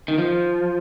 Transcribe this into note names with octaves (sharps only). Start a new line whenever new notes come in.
D#3
F3